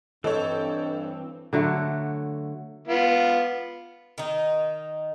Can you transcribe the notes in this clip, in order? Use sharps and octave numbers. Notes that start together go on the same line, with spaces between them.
G2 E3 C4 A4 C#5 D#5
D3 F#3 A3
B3 F4
D#3 D#4